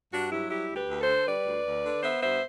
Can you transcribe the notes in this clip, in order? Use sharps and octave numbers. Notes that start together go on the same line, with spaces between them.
G2 D4 F#4
F#3 E4 G4
G3 E4 G4
D2
G4 B4
D2
A4 C5
D3
G3 B4 D5
D2
D2
D3
B3 C5 E5
G2 C5 E5